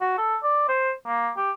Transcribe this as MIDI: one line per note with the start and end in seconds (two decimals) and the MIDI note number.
0.01 0.15 66
0.18 0.36 69
0.43 0.66 74
0.69 0.92 72
1.07 1.31 58
1.36 1.52 67